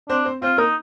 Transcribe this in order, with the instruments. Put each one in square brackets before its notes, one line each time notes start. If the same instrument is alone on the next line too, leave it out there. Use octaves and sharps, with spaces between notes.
[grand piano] C4 C5 [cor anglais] D4
[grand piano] C4 C5
[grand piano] C4 C5 [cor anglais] F4
[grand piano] A#3 A#4 [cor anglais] D#4